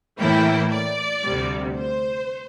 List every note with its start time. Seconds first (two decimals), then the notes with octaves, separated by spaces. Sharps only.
0.20 A2 E3 A#3 E4 G5
0.72 D5
1.24 D2 C3 G3
1.76 C5